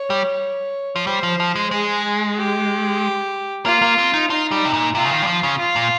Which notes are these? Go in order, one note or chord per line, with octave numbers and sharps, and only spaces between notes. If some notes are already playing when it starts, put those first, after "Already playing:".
Already playing: C#5
G3
F3
G3 C5
F3
F3
G#3
G#3 G#4
G4
A#3 F4
A#3
C4
D#4
D#4 F4
G3
C3
A#2
C3 F4
C#3
D#3
G3
F3
C#3
F4
A#2